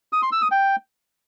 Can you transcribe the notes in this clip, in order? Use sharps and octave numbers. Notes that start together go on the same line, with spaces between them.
D#6
C6
E6
D#6
G5